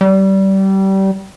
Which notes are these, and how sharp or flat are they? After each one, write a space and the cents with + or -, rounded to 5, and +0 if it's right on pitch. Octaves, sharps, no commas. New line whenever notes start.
G3 -25